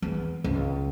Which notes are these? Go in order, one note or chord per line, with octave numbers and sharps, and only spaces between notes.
E2
C#2